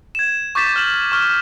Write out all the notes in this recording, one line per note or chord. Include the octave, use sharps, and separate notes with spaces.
G#6 E7
C#6 D6 G6 A6 B6 E7
F6 F#7
C#6 F6